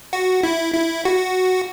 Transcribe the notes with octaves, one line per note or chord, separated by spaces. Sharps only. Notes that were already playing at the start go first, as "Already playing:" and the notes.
F#4
E4
E4
F#4